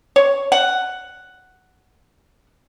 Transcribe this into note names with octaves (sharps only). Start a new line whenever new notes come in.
C#5
F#5